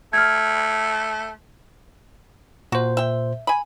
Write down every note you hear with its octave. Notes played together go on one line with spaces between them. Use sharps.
A3 F6 G#6
A#2 F#4 C5
E5 G5
G#5 B5